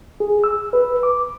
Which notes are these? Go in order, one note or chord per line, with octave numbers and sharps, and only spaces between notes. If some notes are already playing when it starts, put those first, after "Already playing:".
G#4
E6
B4
D6